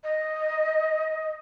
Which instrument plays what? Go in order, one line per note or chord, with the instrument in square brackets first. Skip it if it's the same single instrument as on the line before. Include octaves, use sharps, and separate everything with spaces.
[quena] D#5